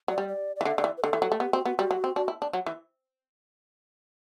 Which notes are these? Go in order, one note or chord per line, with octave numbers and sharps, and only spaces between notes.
F#3 D5
G3
D5
E3 D5
D3 E5
D3 D5
E3
B4
D3 A4
E3
F#3
A3
B3 G4
C4 F#4
B3 F#4
G3 F#4
F#3
C4
D4 F#4
E4
D4
F#3
E3